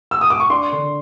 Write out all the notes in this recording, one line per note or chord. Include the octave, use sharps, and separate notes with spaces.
E6
D#6
D6
C#6
D4 C6
D3